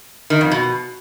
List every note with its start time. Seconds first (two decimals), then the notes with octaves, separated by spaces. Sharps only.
0.30 D#3
0.41 F2
0.51 B2